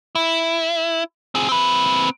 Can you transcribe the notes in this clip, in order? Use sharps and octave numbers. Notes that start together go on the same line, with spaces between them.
E4
C4 G#4
C4 B4